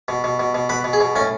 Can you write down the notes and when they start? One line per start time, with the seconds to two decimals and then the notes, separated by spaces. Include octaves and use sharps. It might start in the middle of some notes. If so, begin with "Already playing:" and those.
0.08 B2
0.24 B2
0.39 B2
0.55 B2
0.69 B2 B4
0.84 B2
0.93 G#4
1.00 B2
1.16 A2 C#4